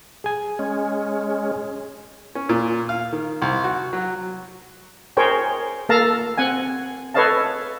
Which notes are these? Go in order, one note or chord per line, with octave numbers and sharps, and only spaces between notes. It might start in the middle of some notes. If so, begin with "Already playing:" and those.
G#4 G#5
G#3 C#4
C#4
A#2
F5
D#3
C2
F#4
F#3
G#4 A#4 C5 C#5 G5
A#3 A4 F5 A5 A#5
C4 F#5 G#5
A4 B4 C#5 D#5 F5 A5